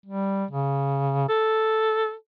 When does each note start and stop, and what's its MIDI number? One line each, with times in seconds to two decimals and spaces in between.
0.06 0.45 55
0.51 1.29 49
1.29 2.14 69